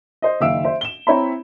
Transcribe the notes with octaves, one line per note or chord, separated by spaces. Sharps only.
C5 D#5
F#1 D#3 E5 F5 E6 D7
C5 E5
E7 G7
C4 E4 C#5 E5 A#5 B5